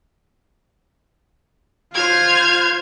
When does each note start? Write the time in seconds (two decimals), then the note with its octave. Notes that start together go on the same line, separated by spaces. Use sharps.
1.94 F4 C5 F6 G#6